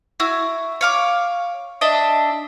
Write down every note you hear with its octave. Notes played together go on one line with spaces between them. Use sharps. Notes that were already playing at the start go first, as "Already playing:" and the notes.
E4 F#4
C#5 F5 D6
D4 D#5 E5